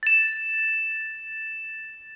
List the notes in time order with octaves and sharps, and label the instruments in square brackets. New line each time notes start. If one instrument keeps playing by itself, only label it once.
[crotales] A6 E7